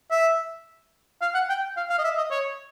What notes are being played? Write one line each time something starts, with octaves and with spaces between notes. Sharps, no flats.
E5
F5
F#5
G5
F5
F5
D#5
E5
D#5
C#5